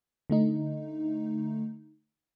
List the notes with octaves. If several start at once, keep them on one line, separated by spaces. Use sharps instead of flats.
D3 A3 D#4